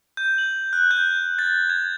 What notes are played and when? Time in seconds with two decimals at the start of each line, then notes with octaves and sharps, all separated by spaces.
0.17 G6
0.38 F#7
0.73 F#6
0.91 G6
1.39 A6
1.70 G#6